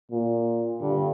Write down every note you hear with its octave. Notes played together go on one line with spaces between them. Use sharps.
A#2
G2 D3